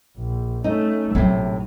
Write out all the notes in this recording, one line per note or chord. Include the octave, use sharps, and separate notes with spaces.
A#1
A3 C#4 D#4
A#1 A2 C3 F#3 D#4